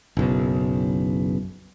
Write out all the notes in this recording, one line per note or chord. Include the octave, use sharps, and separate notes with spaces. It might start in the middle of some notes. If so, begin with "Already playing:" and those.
F#1 B1